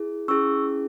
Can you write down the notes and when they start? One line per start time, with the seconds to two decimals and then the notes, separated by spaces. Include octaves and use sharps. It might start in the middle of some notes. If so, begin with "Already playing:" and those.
Already playing: E4 G#4
0.28 C#4 E4 G#4 C#6 E6